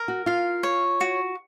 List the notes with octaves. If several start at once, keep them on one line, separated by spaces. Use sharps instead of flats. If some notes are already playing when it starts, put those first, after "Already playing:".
Already playing: A#4
F#4
F4 F5
C#5
F#4